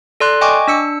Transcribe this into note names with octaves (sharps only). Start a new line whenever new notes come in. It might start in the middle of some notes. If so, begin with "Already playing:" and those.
A4 D5 C6 F#6
D#5 G5 G#5 C#6 D6
D4 E6 C#7